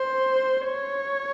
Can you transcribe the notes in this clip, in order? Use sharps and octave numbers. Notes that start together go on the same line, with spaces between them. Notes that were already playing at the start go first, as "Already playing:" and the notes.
Already playing: C5
C#5